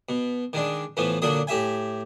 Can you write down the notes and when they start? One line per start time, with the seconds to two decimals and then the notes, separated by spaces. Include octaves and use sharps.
0.09 B2
0.53 D#3 G#3 D4
0.97 A2 E3 F3 B3
1.22 A#2 D3 F#3 D4 D#5
1.47 A2 G4 E5 G#5